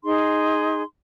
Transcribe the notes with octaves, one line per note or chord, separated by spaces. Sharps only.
D#4 G#4 C6